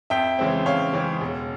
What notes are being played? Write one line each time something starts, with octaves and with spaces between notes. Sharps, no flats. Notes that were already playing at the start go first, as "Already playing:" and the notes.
F2 E5 G5
C#3 E3 G#3 C4
F2 C#5 F5
C#3 E3 G#3 C4
E1